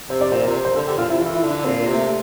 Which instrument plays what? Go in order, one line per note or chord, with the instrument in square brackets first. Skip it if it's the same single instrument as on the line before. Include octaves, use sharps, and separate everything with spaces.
[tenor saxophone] C3 [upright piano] C5
[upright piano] D5
[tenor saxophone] A#2 [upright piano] C5
[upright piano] A#4
[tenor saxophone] C3
[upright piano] C5
C5
[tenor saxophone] D3 [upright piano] A4
[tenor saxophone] D3 [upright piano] G4
[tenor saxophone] A#2 [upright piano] F4
[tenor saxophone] C3 [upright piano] E4
[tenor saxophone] E3 [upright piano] F4
[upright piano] E4
[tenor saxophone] D3
[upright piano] D4
[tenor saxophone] A#2 [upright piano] C4
[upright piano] A#3
[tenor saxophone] C3
[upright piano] A3